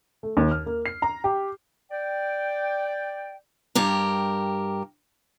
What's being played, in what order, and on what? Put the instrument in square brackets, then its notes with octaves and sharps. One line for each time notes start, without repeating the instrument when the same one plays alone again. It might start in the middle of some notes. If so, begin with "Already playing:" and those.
[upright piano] A3
D#2
F6
A#3
C7
A#5
G4
[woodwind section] D5 G5
[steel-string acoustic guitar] G2 G4 A#4